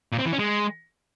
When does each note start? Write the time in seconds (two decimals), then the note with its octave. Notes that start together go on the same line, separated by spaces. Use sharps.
0.12 A#2
0.19 C4
0.26 E3
0.32 C#4
0.39 G#3